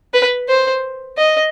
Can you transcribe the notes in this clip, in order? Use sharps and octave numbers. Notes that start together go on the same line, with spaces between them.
B4
C5
D#5